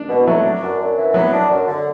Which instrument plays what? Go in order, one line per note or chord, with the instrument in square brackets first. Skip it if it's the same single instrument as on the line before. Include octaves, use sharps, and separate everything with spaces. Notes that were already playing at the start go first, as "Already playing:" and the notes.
Already playing: [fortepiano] D4
[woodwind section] B2 [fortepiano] B3
[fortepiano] E3
[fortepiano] F#3 [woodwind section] A3
[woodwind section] D4
F#2
F#2
E3
[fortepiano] F#3 [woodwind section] B3
[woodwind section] D4
F#2
D3